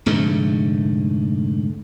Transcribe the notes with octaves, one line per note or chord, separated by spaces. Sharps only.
F1 G#2 D3 A3